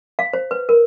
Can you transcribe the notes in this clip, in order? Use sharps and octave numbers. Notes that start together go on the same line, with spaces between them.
F5
C5
B4
A#4